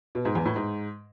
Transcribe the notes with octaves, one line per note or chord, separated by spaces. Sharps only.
B2
G#2
E2
A2
G#2